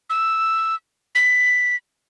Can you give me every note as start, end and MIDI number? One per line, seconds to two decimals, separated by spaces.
0.10 0.75 88
1.15 1.76 95